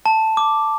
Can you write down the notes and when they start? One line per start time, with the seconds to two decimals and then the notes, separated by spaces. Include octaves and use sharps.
0.06 A5
0.37 D6